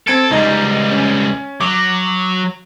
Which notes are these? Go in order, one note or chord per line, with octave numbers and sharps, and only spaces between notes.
C4 A4 G#6 D7
C#2 G3 D#4 D#5
C#4
F#3 D6